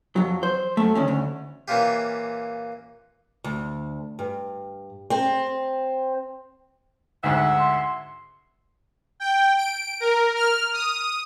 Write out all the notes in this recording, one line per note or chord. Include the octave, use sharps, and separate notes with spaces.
F2 F#3
C5
F#2 A3
D2 D#3 C#4
D2
A#2 E3 A#3 C#4 F4 G4
D2
G2
C4
D2 G#2 E5 F#5
C6
G5
D7
A#4
F6
D#6